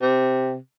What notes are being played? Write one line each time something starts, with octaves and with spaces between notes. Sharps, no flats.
C3